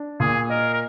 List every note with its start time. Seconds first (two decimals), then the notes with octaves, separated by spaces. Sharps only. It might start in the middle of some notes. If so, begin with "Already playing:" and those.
Already playing: D4
0.20 A#2 G#4
0.50 A#4 D#5
0.73 A#4